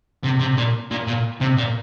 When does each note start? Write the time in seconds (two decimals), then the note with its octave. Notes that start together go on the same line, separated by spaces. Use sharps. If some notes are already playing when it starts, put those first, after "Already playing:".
0.24 C3
0.40 C3
0.58 A#2
0.91 A#2
1.07 A#2
1.41 C3
1.57 A#2